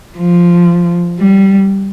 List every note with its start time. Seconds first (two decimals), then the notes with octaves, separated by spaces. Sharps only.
0.17 F3
1.20 G3